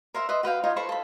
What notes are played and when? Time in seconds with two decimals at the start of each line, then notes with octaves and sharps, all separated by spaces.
0.14 A#4 C5 E5
0.29 B4 D#5 E5 C6
0.43 F#4 B4 F5 G5
0.64 D#4 F4 C#5 D#5
0.76 A4 C5 B5 C#6
0.89 A4 B5